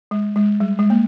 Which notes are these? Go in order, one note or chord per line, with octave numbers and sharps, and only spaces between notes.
G#3
G#3
G3
G#3
A#3